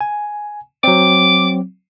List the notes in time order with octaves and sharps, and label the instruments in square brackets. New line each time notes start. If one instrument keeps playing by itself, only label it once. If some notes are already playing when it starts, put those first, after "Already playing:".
[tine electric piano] G#5
[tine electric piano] F#3 C4 [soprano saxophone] D6